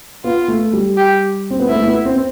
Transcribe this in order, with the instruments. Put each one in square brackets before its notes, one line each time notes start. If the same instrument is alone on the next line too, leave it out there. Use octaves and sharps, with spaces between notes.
[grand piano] B3 [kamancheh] F4
[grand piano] A3
G3
[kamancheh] G4
[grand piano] C4
B3
[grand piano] A3 [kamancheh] E4
[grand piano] A3
B3
C4
C4